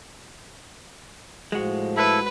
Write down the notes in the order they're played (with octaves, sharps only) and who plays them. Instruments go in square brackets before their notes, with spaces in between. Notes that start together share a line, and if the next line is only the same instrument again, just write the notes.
[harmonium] A2 F3 [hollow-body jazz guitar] G#3 F#4
[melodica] E4 A4 E5 [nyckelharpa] B4